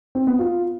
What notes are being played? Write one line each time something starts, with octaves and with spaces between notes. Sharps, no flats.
C4
B3
F4